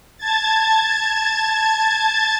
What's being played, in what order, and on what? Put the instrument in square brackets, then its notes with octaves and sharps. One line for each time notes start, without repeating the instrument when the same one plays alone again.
[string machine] A5 G#6 A6